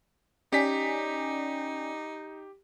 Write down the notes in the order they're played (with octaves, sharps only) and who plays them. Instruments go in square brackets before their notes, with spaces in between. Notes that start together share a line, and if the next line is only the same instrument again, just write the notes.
[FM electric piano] C#4 D5 G#5 [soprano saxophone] D#4 [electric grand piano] G4 B6